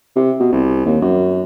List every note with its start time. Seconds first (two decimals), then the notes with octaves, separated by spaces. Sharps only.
0.16 C3
0.40 B2
0.53 C2
0.86 D#2
1.01 F#2